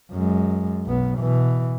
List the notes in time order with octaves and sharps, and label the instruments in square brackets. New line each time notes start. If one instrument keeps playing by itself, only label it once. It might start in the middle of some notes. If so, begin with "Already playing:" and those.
[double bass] F#2 G#3
B1 B3
B2 E3